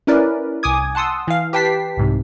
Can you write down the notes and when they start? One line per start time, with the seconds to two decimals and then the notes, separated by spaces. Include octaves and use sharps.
0.07 C#4 E4 A#4 B4 D5
0.63 C2 G#5 D6 D#6 G#6
0.95 F#5 A5 C6 D#6 E6
1.27 E3 F5
1.53 G4 B4 G5 A5 B6 C7
1.97 C2 G#2 C3